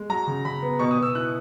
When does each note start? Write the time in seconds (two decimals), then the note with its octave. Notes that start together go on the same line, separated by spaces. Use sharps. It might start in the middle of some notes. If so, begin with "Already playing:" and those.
Already playing: G#3
0.09 F#3 A#5
0.27 C#3
0.45 C#3 B5
0.62 B3
0.79 B2 C#6
0.91 D#6
0.98 B2 E6
1.15 E4 F#6